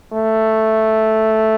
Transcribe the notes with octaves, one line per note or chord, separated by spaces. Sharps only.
A3